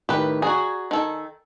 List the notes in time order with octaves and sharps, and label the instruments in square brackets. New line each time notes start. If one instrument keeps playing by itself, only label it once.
[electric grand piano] A2 D#3 [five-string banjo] G4 B4
[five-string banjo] F#4 G#4 [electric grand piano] D5 G#5 A#5
[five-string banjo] D#3 A4